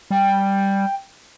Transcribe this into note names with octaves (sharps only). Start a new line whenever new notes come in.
G3 G5